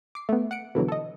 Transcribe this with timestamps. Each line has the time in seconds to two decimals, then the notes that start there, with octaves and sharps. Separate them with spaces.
0.15 D6 C7
0.29 A3 B3
0.51 F#5 C#7 D7
0.75 B2 D3 E3 F#3
0.88 A4 D#5